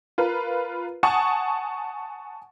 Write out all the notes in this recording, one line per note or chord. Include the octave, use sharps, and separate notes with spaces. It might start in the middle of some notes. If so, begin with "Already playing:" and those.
F4 A#4 B4
F#5 G#5 A5 C#6 D#6